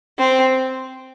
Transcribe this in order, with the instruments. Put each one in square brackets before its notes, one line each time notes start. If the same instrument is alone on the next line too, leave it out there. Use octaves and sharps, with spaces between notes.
[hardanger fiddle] C4